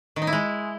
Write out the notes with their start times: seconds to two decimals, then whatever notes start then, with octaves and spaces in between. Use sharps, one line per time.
0.16 D#3
0.22 D#4
0.27 E4
0.33 G#3